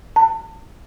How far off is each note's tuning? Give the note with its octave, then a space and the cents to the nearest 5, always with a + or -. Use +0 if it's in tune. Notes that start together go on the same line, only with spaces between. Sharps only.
A5 +30